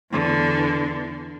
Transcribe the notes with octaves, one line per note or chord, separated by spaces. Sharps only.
E2 D3